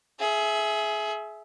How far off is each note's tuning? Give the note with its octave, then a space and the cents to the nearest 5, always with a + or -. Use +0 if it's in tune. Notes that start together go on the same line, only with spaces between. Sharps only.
G#4 +25 E5 +0